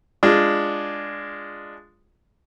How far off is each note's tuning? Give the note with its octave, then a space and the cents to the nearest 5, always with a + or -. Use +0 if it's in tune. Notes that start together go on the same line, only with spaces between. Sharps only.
G#3 -5 D4 +0 F4 -5